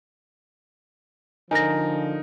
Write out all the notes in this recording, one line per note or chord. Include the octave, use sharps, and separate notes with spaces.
D3 F3 D#4 A#4 G#5 A#6